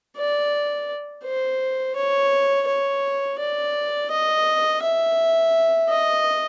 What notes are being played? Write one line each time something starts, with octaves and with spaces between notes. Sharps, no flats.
D5
C5
C#5
C#5
D5
D#5
E5
D#5